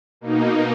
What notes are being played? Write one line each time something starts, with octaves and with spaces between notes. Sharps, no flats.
B2 A#3 D#4